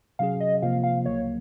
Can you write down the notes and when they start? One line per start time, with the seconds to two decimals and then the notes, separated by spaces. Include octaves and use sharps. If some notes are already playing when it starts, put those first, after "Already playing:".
0.19 C3 F#3 C#4 G#4 F5
0.40 D#5
0.62 C3 F3 A#3 F4 C5 F5
0.84 F5
1.05 C#2 C#3 F#3 A#3 C#5